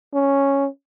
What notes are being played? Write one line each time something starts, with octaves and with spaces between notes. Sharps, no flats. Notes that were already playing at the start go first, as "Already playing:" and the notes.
C#4